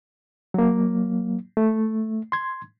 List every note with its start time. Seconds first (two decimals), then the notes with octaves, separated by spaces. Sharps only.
0.54 F#3 A#3
1.57 A3
2.32 C6 G#6